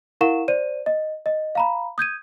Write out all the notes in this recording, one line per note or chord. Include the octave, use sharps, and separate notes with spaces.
E4 A#4 F5 F#5 C#6 E7
C5 D5 D#7
D#5
D#5
F5 A#5 B5
D#6 G6 G#6 D#7